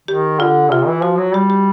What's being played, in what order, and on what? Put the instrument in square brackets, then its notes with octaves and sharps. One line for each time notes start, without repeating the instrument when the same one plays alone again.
[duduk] D#3 [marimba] G4
[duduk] D3 [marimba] F4
[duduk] C3 [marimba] F4
[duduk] E3
[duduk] F3 [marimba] F#4
[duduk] F#3
[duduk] G3 [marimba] G4
[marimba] G4